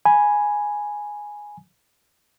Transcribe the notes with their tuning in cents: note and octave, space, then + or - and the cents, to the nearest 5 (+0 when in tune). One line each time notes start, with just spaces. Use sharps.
G#5 +0 B5 -15